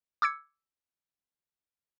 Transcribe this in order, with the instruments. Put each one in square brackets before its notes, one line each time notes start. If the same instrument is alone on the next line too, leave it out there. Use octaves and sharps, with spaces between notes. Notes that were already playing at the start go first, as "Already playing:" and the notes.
[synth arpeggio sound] D6 E6 G#6 C#7